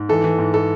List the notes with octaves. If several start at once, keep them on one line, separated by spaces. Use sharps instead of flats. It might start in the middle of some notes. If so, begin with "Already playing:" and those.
Already playing: G#2
E3 A4
E3
G#2
A4